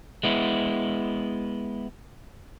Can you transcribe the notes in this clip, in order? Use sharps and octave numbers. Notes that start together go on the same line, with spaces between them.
G#3 B3 E4